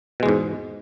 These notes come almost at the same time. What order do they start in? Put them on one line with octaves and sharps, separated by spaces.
B2 G#3 E2 G#2